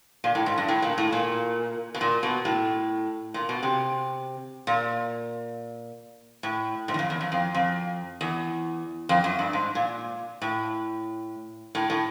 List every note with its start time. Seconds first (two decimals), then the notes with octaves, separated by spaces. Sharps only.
0.24 A#2
0.35 A2
0.46 G#2
0.58 G2
0.68 A2
0.82 A#2
0.98 A2
1.12 A#2
1.95 B2
2.01 A#2
2.23 B2
2.45 A2
3.34 A#2
3.49 B2
3.63 C3
4.67 A#2
6.43 A2
6.88 G#2
6.94 E2
6.99 F2
7.10 E2
7.21 F2
7.32 F2
7.55 F2
8.21 E2
9.09 F2
9.24 F#2
9.39 G2
9.53 G#2
9.75 A#2
10.42 A2
11.75 A2
11.90 A2